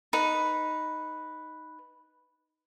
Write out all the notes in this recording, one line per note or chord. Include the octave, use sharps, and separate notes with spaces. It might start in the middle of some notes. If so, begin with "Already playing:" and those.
D#4 B4